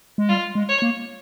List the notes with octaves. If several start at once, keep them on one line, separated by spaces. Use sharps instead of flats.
G#3
G3 F4
G#3
C#5
A#3